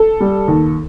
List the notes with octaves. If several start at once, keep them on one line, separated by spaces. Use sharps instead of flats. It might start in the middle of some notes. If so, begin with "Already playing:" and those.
Already playing: A4
G3
D#2